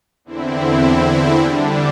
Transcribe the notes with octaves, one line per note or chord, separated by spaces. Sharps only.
E2 D3 C4 E4
D3 G3 D4